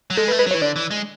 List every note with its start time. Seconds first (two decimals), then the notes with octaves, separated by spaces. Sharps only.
0.10 F#3
0.17 G#3 A4
0.28 B4
0.31 A3
0.39 G#3 B4
0.47 F#3
0.51 C#5
0.54 E3
0.61 D3 D5
0.76 E3
0.91 G#3